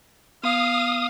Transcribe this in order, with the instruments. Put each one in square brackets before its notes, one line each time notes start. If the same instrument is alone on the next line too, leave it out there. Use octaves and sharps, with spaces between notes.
[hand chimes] B3 [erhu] F5 [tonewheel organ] D#6